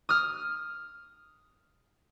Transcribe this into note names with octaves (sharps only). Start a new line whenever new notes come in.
D#6 F6